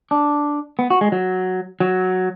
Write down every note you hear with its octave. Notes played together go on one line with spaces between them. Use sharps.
D4
B3
F#4
G#3
F#3
F#3